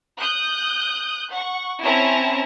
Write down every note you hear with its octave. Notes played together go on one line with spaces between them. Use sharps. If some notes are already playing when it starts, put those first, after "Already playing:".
D#6 F#6 G6
F#5 C#6
C4 C#4 E4 A5 A#5